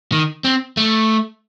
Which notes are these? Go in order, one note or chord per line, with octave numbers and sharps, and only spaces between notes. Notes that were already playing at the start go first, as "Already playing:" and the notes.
D#3
C4
A3